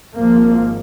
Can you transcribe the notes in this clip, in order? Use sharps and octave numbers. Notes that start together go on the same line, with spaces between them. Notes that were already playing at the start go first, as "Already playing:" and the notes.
G#1 G#2 F3 A#3